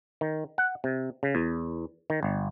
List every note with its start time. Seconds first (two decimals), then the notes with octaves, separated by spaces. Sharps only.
0.21 D#3
0.58 F#5
0.84 C3
1.23 C#3
1.35 E2
2.10 D#3
2.23 G1